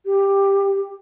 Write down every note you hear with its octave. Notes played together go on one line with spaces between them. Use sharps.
G4